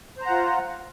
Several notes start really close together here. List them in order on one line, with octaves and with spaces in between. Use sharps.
C5 A#5 F#5 F4